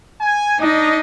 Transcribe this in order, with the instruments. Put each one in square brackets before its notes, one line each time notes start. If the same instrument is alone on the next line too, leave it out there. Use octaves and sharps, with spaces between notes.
[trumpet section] G#5
[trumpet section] D4 D#5 [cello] D#4